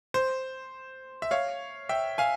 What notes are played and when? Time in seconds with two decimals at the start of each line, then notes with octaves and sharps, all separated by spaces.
0.14 C5
1.22 E5
1.31 C#5 F5
1.89 E5 G5
2.18 F5 G#5